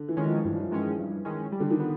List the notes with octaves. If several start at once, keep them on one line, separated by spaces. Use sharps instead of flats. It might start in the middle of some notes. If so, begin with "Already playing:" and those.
Already playing: D3
E3
D#3 G#3 C#4
F3
G2 E3
F3
E3
D#3 G#3 C#4
G2
D#3 G#3 C#4
G3
D3
D#3
B3